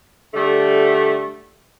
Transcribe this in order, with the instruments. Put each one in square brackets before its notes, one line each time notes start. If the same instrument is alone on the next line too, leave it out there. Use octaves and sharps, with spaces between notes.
[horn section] D3 G3 A3